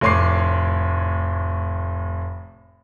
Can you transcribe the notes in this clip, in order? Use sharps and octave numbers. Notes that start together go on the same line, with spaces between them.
F1 A2 C#5 C6 D6 C7